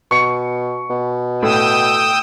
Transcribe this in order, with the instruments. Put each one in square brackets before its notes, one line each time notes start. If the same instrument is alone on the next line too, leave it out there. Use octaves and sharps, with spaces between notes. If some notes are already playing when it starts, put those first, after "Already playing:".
[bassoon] B2 [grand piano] C#6 C#7
[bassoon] B2
[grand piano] A2 [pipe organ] G5 D#6 E6